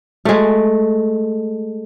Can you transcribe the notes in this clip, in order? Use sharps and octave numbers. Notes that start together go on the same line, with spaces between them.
G#3 A3